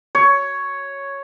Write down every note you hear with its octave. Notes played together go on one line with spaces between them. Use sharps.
C#5